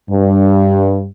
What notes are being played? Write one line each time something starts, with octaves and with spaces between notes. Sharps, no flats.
G2